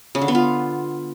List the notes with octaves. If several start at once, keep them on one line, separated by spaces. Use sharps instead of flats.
C#3
D3
B3
F4